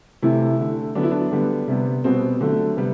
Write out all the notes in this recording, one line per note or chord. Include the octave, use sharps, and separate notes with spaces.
C3 E3 A3 E4
D3 A3
D3 F#3 B3 D4
E4
D4
D3 G3 B3
C3 G3 B3
B2 G3 B3 C4
D3 F#3 A3
C3 G3 B3